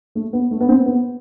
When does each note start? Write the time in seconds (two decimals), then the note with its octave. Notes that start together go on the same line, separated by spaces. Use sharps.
0.15 A3
0.33 B3
0.51 A3
0.61 B3
0.69 C4
0.86 B3